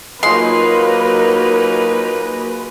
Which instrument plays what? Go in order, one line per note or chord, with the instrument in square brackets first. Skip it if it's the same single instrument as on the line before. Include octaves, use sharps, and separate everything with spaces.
[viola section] F#3 A#3 D#4 [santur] G#3 F4 [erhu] B4 [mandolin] C6